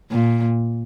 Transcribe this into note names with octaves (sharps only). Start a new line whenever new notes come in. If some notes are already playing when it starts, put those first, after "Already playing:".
A#2